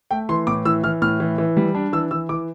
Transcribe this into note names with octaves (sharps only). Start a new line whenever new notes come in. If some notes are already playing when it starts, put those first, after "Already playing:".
A3 G5
E3 C6
A2 D6
E3 E6
E3 F6
A2 F6
E3
E3
G3
D4
E3 E6
E3 E6
E3 D6